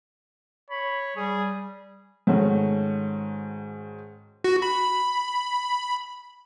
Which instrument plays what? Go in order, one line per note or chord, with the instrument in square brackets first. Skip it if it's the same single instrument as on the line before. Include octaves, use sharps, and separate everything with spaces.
[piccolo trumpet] C#5 [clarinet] B5
[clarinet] G3 [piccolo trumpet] G#4
[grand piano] G#2 D#3 A3 C#4 F#4
[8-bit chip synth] F#4
B5